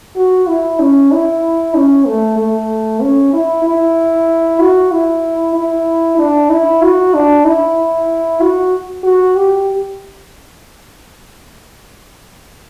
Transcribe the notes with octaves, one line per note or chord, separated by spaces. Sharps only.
F#4
E4
C#4
E4
C#4
A3
A3
C#4
E4
E4
F#4
E4
E4
D4
E4
F#4
D4
E4
F#4
F#4
G4